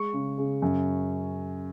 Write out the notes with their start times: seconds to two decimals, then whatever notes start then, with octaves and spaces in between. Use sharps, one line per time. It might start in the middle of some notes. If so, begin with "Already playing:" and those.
Already playing: G#3 C#6
0.13 C#3
0.38 C#3
0.62 F#2